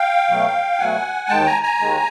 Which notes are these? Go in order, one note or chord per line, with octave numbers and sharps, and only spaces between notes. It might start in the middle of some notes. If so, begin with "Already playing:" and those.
Already playing: F5 G5
B2 F#3 A3
B2 F#3 A3 F#5 G#5
D#2 D#3 G#3 G5 A5
G#5 A#5
G#5 A#5
D#2 D#3 G#3